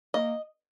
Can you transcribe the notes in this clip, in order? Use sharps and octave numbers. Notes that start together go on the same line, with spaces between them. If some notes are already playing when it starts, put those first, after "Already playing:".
A#3 D#5